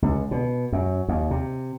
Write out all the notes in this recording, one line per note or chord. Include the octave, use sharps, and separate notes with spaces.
C#2
B2
F#2
D#2
C3